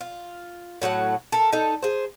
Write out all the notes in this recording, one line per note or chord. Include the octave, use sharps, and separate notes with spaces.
F4
A2 F#3 G4 F#5
A4 A#4
D#4 A4
G#4 C5